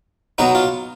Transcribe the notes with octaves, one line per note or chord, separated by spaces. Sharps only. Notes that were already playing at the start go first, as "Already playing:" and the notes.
B2 F#3 B3 D#4
F4